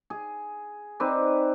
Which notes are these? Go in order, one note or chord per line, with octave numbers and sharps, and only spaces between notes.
G#4
C4 D#4 B4 D5